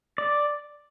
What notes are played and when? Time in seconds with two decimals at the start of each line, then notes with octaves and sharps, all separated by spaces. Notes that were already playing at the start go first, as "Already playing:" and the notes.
0.18 D5